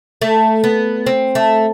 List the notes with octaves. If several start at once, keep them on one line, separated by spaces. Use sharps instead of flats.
A3
B3
C4
A3